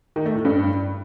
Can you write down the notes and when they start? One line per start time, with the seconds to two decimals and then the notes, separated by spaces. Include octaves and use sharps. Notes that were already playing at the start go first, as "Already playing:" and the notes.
0.16 D#3
0.26 A3
0.35 A2
0.45 G2